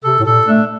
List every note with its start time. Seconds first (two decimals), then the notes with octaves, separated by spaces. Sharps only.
0.04 C3 A4
0.20 A2
0.25 A#2 A4
0.47 A3 D4